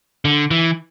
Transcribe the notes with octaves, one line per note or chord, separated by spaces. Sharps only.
D3
E3